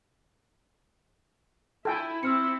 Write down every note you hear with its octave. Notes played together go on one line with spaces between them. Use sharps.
E4 A4 G5 G#5
C4 E4 E6 F6 C#7